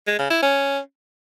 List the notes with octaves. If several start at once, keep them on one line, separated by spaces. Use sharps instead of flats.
G#3
C#3
E4
C#4